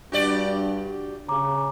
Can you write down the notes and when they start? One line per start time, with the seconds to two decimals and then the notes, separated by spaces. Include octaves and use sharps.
0.12 G2 D4 F#4 G4 D5
1.29 C#3 A#5 D6